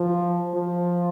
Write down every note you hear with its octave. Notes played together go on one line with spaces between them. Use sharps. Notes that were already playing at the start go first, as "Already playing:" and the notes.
Already playing: F3
F3